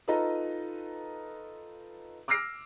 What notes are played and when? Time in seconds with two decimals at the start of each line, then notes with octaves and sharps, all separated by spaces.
0.08 D#4 F4 A4 B4 D#5 A#5
2.28 D6 E6 F6 A#6 C7 D7